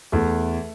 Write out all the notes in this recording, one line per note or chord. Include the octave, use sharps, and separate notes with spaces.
E2 A3